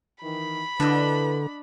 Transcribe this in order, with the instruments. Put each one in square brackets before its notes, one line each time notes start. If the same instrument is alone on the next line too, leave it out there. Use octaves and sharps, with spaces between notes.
[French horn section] D#3 E3 [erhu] B5
[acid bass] D3 [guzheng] D4 D#5 [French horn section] E4 A4 B4